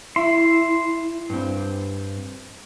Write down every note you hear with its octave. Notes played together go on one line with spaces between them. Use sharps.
E4 C6
G2 C4